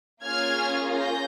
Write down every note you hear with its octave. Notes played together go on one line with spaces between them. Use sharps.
A#3 C#4 F4 G#4 F6 G#6
G6 A#6